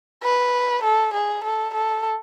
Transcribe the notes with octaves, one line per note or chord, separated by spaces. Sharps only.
B4
A4
G#4
A4
A4